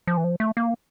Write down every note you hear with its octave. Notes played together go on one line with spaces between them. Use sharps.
F3
E3
F3
A3
A#3